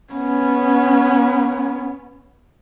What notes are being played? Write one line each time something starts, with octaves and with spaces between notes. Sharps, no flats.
B3 C#4